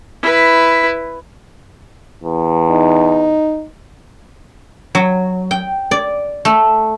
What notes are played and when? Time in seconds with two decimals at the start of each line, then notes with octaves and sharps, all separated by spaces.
0.22 E4 B4
2.23 E2
2.71 D#4
4.95 F#3
5.51 G5
5.91 D5
6.45 A3